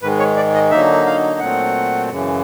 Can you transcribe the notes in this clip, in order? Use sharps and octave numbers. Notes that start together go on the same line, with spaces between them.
G#2 D#3 G#3 B4
C#5
D5
D#5
D3 F#3 A#3 D#4 E5
F5
A#2 F#3 A3 C4 F#5
F#2 C#3 E3